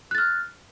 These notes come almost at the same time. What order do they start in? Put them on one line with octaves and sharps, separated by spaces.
F#6 A6 F6